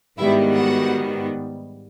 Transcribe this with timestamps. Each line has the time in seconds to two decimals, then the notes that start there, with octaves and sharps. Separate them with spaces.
0.18 G#2 D#3 G3 B3 E4 E5
0.56 F#4 F#5